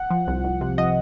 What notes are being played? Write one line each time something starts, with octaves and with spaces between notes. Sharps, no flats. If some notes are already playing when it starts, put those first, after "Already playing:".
Already playing: F#5
F3
C2
C2
C3
F3 D#5